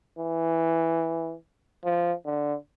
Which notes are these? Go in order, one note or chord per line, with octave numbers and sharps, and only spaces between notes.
E3
F3
D3